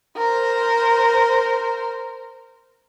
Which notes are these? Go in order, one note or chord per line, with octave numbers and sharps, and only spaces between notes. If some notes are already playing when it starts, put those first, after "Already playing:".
A#4 C5